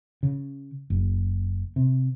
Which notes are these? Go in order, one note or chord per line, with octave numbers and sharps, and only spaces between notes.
C#3
F#1
C3